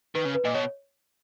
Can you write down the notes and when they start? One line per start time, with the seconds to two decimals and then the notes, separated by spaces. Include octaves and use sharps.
0.15 D#3 B4
0.25 C#3
0.35 B4
0.45 A#2 D#5
0.54 B2 C#5